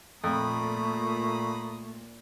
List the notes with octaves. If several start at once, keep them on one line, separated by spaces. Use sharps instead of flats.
F2 A#2 A3 A#5 B5 D#6